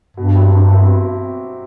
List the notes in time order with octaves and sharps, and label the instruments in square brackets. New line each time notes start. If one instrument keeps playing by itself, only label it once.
[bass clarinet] G2 [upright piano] B2
[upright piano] F#3 C4 E4 G4
[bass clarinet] G2 [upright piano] B2
[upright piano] F#3 C4 E4 G4